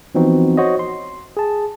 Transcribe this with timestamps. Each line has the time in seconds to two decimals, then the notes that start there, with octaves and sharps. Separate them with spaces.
0.15 E3 F3 B3 C4 D#4 F#4
0.57 F#4 C5 C#5 D#5
0.79 C6
1.37 G#4 A5